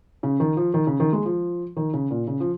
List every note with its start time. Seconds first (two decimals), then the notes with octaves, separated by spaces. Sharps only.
0.23 C#3
0.40 D#3
0.57 F3
0.74 D#3
0.87 C#3
1.00 D#3
1.13 G#3
1.25 F3
1.77 D#3
1.93 C#3
2.11 A#2
2.27 C#3
2.40 F3